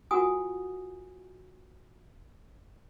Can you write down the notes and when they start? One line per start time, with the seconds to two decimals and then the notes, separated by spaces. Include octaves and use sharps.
0.11 F4 F#4 A#4 F#5 G#5 D#6